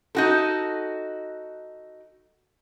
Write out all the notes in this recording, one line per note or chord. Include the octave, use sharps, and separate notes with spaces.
D#4 F#4 A4